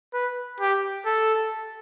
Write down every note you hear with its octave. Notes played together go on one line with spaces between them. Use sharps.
B4
G4
A4